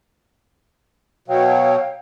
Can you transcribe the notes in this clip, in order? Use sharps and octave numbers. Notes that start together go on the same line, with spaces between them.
B2 F#3 C#5 F5 G5